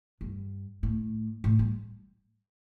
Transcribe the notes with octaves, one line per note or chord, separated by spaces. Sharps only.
G2
A2
A2
G3